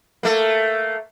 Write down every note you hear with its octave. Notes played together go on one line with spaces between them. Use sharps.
A3 A#3